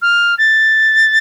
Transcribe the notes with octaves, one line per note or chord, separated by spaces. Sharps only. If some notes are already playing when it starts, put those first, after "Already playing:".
F6
A6